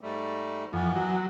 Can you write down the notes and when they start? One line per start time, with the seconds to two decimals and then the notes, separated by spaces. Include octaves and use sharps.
0.01 G#2 G3 A3
0.73 F2 E3 B3
0.96 F#3